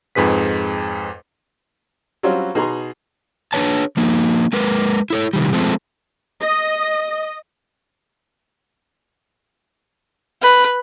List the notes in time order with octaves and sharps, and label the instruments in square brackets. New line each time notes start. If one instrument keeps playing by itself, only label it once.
[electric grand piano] F2 G#2 G#4 B4 B6
[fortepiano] F#3 G3 C4 C#4 F4 F#4
B2 D#4 G#4 G#5 A#5 C6
[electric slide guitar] D4 G#4 B4 C#5 A5
F3 A#3 D#4
G#3 A#4 B4
E4 A4 C#5
C3 D#3 G3
F3 G#3 A3 C4 A4
[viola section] D#5
[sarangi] B4